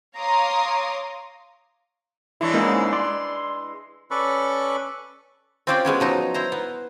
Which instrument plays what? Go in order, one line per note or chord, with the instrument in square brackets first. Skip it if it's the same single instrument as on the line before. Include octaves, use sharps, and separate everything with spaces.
[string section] C#5 F5 A#5 C6 D6 D#6
[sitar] E3 G#3 D4 [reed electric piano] E4 C#5
[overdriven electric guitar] G#2 [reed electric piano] A#3 C#4 D#4
[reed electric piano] D5 [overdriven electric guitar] C6
[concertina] C#4 A4 B4 D5 B5 C#6
[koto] C4 C#4 F4 G4 C5 D5
F#3 G#3 B3 C#4
F3 F#3 D#4
E4 C5 A#5
B3